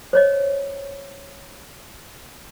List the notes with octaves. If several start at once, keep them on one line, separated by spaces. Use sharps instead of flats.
C5 C#5 D#5